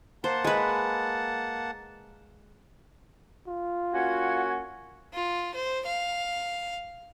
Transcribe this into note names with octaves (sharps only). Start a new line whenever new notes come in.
A#3 C5 F#5 A5
G#3 B4
F4
A#3 C#4 F#4 F#5 G#6
F4
C5
F5